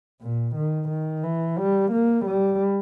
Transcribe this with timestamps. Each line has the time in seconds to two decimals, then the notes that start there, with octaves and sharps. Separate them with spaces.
0.22 A#2
0.55 D#3
0.89 D#3
1.23 E3
1.58 G3
1.92 A#3
2.25 G3